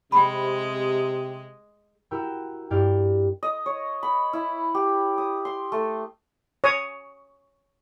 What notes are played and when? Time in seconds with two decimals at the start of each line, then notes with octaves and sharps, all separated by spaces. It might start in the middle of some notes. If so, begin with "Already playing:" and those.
0.12 C3 G#3 G5 B5
2.11 E4 F#4 A#4 G5 E6
2.70 G2 E4 D5 F5 G5
3.43 D#5
3.66 C#5
4.03 B5
4.33 E4
4.75 G4
5.18 D#6
5.45 C6
5.72 A3
6.64 C#5 D#6